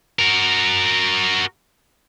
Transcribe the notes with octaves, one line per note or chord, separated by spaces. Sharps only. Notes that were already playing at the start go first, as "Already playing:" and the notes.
F#4 A#4